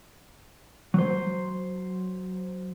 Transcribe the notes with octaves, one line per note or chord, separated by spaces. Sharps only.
F#3 C5